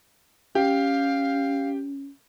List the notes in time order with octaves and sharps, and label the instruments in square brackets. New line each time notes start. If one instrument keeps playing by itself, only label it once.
[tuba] C#4 [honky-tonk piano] G4 [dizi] F5